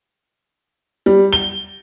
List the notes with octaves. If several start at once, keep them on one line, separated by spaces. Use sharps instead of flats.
G3
G7